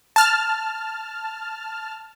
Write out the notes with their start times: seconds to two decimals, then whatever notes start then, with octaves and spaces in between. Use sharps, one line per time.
0.16 A5 F6